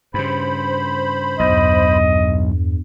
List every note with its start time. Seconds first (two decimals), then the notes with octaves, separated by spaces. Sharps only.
0.14 G2 C#3 C5 B5
1.39 B1 E2 G2 D#5